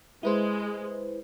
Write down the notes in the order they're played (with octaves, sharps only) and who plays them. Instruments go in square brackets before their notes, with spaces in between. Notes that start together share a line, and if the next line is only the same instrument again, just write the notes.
[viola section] G#3 [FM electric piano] E4 B4 C5